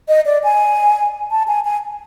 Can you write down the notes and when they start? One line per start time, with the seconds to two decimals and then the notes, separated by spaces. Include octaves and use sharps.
0.08 D#5
0.26 D5
0.44 G#5
1.31 A5
1.48 G#5
1.65 G#5